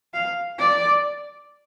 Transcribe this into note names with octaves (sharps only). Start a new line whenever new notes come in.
F5
D5